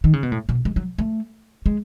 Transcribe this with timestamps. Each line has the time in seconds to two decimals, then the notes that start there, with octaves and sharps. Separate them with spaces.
0.04 D#3
0.13 C#3
0.23 B2
0.32 A2
0.49 B2
0.65 G#3
0.76 F#3
0.98 A3
1.66 G#3